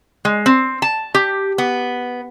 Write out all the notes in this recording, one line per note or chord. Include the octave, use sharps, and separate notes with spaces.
G#3
C4
A5
G4
B3